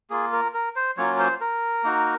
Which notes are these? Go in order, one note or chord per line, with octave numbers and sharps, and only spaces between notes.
A#3 F4 G#4
A#4
A#4
C5
F#3 A#3 C#4 F4 C#5
C5
A#4
A#3 D#4 F#4